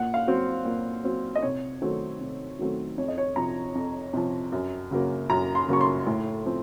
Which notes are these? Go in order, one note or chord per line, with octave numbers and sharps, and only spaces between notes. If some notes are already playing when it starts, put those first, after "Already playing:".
Already playing: A#2 F#5
F5
F#3 C4
A#2
F#3 C4
D#5
C3 C#5
D#3 F#3 A3 C4
C3
D#3 F#3 A3 C4
F2 C#5
D#5
C#5
C3 F3 A#5
F2
C3 F3
F#2
C#3 F#3 A#3
F#2 A#5
C6
C#3 F#3 A#3 C#6
C6
A2
F3 C4